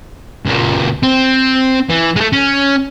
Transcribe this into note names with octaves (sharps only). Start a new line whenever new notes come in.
C#2 A#2
C4
E3
G#3 A3
C#4